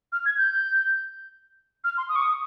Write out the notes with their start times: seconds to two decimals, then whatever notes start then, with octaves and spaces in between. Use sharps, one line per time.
0.12 F6
0.25 G#6
0.37 G6
1.84 F6
1.97 C6
2.09 D#6
2.15 C#6
2.22 D#6